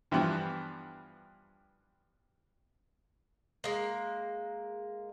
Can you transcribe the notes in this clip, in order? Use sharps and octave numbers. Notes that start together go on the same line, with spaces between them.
G2 E3 F3 B3
G#3 A#3